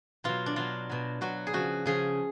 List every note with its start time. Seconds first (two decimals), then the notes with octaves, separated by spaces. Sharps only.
0.24 B2 F#3 F4
0.46 D4
0.56 B2 F#3 F4
0.89 B2 F#3
1.21 B2 F#3 F#4
1.47 G#4
1.53 C#3 F3 F#4
1.86 C#3 F3 G#4